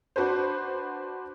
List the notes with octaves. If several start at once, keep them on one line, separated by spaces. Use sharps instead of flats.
D4 F#4 B4 C5